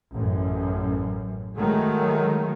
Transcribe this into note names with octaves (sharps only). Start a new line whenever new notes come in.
A1 F#2
D#3 F#3 G#3 A3